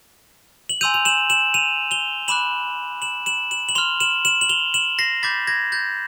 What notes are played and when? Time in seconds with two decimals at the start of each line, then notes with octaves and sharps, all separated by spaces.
0.69 F#7
0.81 G#5 C6 E6 G6 D#7 F7
0.94 F7
1.05 E7 F#7
1.30 E7 F#7
1.54 D#7 F7
1.91 F7 G7
2.28 B5 D6 F#6 E7 F#7
3.02 E7 F#7
3.26 E7 F#7
3.51 E7 F#7
3.69 F#7
3.75 C6 F6 F7 G7
4.00 E7 F#7
4.25 E7 F#7
4.41 F#7
4.49 F7 G7
4.74 E7 F#7
4.99 A#6 C7
5.23 B5 D6 G6 A6 B6
5.47 G#6 A#6
5.72 G6 A6